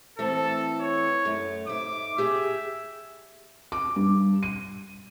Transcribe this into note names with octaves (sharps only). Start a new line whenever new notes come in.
E3 A3 C4 A4
C#5
F#2 A3
G#2 E5 D6
G4 G#4 E5 G5
D6
G2
D#7